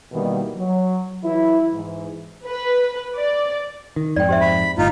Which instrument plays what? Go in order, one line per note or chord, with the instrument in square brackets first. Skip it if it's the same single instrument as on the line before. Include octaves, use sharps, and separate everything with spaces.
[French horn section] B2 D#3 E3 G3 A#3
F#3
E3 F#3 E4
G#2 E3
[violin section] B4
D5
[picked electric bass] D#3
[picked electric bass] F2 G#2 [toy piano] D5 G5
[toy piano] G4 C5 E5
[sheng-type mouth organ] B5
[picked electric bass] G1 A2 [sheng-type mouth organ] D#4 F4